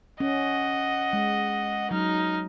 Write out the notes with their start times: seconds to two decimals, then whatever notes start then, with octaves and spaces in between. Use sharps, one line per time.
0.20 C#4 D#5 F#5
1.13 G#3
1.91 F#3 D#4 F6